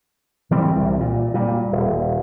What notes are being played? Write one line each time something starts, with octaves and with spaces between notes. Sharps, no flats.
E3 G3 C4
C2 C3
A#2
A#2 G3
D#1